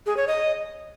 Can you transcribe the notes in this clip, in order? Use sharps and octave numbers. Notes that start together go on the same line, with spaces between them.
G#4
C#5
D#5